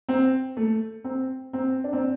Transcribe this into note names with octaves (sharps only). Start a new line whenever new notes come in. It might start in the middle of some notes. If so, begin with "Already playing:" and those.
C4
A3
C4
C4
D4
C4